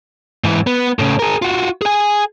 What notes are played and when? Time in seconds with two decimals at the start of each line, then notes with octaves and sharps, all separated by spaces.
0.44 G#2 E3
0.67 B3
0.99 A2 C#3
1.19 G#4 A#4
1.42 F4 F#4
1.82 G#4 G#5